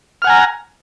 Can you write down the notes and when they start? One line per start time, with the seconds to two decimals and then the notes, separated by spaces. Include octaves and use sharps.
0.22 F6
0.24 F#5
0.27 G#5
0.30 A#5